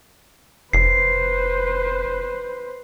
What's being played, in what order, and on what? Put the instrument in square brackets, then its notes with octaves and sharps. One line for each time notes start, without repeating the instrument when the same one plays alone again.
[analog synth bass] F1 [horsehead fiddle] B4 C5 [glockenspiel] C7